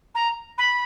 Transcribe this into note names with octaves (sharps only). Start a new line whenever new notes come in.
A#5
B5